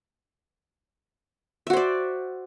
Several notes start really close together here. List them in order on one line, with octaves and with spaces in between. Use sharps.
E5 F#4 C5 D5